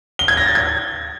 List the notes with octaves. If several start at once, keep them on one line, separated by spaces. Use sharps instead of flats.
G7
G#6
A#6
A6
G#6